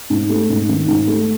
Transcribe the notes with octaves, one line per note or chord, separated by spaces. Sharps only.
G#2
A3
G#2
D#3
G#2
A3